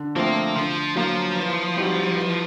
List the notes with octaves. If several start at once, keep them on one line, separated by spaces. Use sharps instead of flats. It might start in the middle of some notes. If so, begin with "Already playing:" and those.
Already playing: D3
F3 A3 A#3 C4
D3 F3
F3 F#3 A#3
E3
G3 C4 D#4 F#4
E3